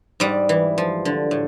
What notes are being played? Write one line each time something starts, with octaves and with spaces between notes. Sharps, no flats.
G#2 G3
E3
F3
D3
A2